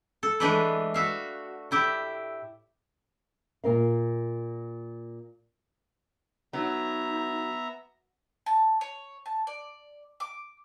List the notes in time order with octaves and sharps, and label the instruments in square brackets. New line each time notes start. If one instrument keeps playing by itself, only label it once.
[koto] A4
E3 G#3 A3 D4 A4 B4
F#4 E5 F5
A2 E4 G4 E5
[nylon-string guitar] A#2 A#4 F5
[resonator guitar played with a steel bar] F#3 [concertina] B3 E5 A#5 [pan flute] D#4
[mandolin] A5
C#5
A5
D5
D6